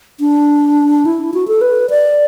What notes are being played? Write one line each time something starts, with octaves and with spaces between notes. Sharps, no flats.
D4
E4
F#4
A4
B4
D5